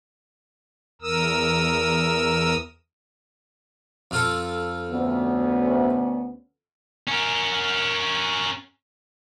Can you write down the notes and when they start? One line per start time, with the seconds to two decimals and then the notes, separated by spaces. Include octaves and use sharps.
1.02 E2 A#4 D#6 E6
4.11 F2 F4 A4
4.91 D2 B3 C#4
7.08 C#4 A#4